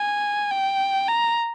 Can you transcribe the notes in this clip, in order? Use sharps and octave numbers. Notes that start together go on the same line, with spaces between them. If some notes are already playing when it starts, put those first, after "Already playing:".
Already playing: G#5
G5
A#5